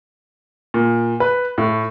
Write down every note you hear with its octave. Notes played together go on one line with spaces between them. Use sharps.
A#2
B4
A2